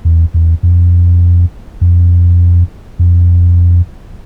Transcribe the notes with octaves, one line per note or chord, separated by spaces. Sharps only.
E2
E2
F2
F2
F2